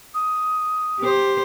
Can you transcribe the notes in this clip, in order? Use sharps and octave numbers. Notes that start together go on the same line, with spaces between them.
D#6
G4 C5